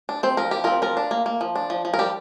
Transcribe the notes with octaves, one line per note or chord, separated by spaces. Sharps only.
D4
C4 C5
F3 A#4
F3 G4
C4 F4 A#4
F3 F4 A#4
D4
A#3
A#3
F3
D4
F3
F3
A#4
G3 G4